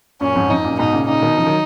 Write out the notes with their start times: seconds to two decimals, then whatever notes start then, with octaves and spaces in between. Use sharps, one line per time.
0.21 F#2 A#2 C#4
0.35 F2 G#2
0.50 F2 D#4
0.64 F#2 A#2
0.79 G#2 B2 D#4
0.93 A#2 C#3
1.08 A#2 C#3 D#4
1.22 B2 D#3
1.37 C#3 F3
1.47 D#3 F#3